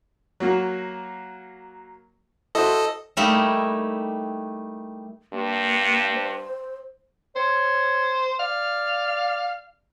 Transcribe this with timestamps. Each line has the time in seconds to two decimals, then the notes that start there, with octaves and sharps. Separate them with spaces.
0.40 F#3 A#3 F#4
2.55 E4 F#4 A4 C5 D#5
3.17 G3 A3 A#3 D#4 E4
5.33 G2 A#3
6.15 C5
7.36 C5 C#5
8.39 D5 F5